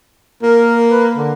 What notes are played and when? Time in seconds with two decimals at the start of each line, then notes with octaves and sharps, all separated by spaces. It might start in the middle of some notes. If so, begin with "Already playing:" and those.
0.43 A#3 A#4
0.89 B4
1.16 D3